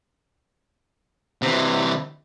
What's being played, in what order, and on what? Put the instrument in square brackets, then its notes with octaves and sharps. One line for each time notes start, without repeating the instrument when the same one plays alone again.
[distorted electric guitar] C3 E3